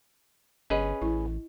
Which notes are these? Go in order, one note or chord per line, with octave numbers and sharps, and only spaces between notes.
G1 C#4 G#4 B4 D#5
A1 E4